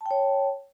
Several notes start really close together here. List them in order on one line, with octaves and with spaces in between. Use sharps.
A5 G5 C#5